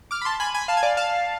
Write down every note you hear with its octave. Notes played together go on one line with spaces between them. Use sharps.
D6 F6
B5
A5 C6
G#5 B5
G#5 B5
F5 A5
G#5
D5 F5
F5 A5